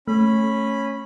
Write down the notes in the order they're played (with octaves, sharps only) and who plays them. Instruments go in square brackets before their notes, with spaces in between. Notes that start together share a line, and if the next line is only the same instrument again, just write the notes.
[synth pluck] A3 [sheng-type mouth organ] C#4 B5